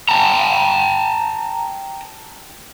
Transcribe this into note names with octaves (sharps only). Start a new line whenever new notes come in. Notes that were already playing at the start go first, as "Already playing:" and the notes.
G5 A5 A#5